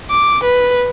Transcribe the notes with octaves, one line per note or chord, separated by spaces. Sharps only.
D6
B4